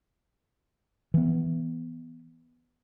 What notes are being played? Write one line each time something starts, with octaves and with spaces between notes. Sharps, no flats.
E3 B3